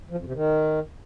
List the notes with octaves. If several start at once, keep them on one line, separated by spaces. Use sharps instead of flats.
F3
F2
C3
D#3